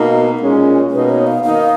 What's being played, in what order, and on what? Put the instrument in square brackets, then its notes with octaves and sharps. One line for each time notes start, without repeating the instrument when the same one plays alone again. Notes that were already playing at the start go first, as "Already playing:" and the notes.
Already playing: [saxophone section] B2 A#3 D#4
A#2 G#3 C#4
[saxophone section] B2 A#3 D#4 [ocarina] B4
[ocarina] C#5
F5
[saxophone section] D#3 A#3 D#4 [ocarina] F5